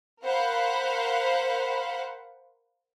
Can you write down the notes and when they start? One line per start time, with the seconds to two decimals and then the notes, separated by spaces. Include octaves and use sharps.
0.24 A#4 C5 F5 F#5 B5